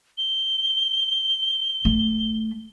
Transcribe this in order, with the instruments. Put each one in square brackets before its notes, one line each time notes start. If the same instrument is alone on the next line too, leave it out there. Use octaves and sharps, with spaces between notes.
[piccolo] G7
[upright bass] A3